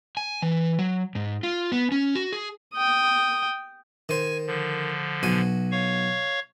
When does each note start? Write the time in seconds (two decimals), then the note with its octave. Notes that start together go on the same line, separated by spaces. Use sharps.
0.17 G#5
0.42 E3
0.79 F#3
1.15 G#2
1.43 F4
1.72 B3
1.92 C#4
2.15 F#4
2.33 G#4
2.74 G5 D#6
4.09 D#3 C5 G#5
4.47 D3 F3
5.23 B1 F#4 G#5
5.71 C#5 F5 C#6